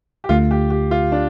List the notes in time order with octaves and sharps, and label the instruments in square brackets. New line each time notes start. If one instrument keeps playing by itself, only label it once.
[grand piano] G4
[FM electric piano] D2 D3 A3 [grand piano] F4
[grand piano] G4
G4
F4
D4